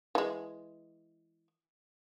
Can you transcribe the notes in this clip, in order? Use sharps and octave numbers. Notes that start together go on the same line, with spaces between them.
E3 G#3